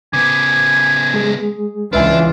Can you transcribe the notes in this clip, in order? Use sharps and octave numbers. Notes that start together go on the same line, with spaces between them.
C#3 B3 G#5 D6
G#3 G#4
C#2 E3 D4 F4 B4 E5 G#5